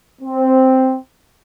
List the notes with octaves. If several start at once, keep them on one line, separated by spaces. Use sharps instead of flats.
C4